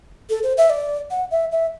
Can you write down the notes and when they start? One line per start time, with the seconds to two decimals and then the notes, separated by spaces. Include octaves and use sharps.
0.30 A4
0.43 C5
0.57 E5
0.70 D5
1.11 F#5
1.31 E5
1.52 E5